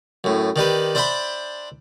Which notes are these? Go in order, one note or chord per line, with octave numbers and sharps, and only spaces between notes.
F#2 A2
D#3 D4 G4 B4
D4 C5 E5 G5 A5 B5